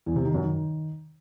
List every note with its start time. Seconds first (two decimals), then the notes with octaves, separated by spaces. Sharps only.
0.06 E2
0.16 C3
0.25 D#3
0.34 F#2
0.44 D#3